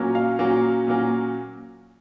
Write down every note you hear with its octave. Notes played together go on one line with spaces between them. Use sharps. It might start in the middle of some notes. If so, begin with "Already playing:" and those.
Already playing: A#2 F#3 A#3 C#4
F5
A#2 F#3 A#3 C#4
A#2 F#3 A#3 C#4